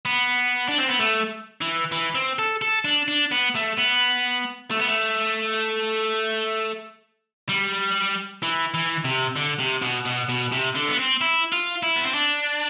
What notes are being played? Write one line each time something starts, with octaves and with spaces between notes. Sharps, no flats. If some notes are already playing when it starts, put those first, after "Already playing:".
B3
D4
C4
B3
A3
E3
E3
C4
A4
A4
D4
D4
B3
A3
B3
A3
B3
A3
G3
E3
E3
C3
D3
C3
B2
B2
B2
C3
D3
B3
C4
E4
F4
E4
B3
C4
D4